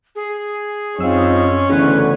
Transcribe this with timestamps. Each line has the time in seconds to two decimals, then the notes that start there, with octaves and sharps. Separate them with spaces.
0.16 G#4
0.99 F#2 C4 C#4 D#4 F4 E6
1.70 D2 C#3 E3 B3 B4